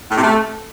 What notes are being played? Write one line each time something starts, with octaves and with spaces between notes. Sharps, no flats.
A2
C3
A3